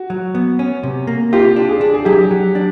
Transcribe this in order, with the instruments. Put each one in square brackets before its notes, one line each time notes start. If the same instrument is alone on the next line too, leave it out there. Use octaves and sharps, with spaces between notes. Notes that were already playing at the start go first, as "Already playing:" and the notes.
Already playing: [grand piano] F#4
[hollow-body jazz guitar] F#3
B3
C#4
C3
A#3
[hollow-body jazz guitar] F4 [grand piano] G4
[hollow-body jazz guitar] D4
[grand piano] G#4
[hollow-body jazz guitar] D4
[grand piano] G#4
[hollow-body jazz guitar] F#3 [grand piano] G4
[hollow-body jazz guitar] F#3
D4